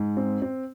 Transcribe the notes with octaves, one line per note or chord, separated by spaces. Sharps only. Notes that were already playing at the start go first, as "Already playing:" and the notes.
Already playing: G#2
C4
C4